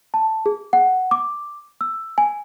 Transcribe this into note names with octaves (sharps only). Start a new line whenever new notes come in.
A5
G#4
F#5
D6
E6
G#5